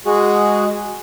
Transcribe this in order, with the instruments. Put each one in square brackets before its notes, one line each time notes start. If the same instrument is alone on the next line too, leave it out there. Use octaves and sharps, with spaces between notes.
[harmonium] G#3 F#4 G#4